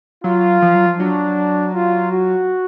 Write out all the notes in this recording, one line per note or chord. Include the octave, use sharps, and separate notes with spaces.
F#3 F4
F3
F#3
F3
F#3 D4
F4
F#4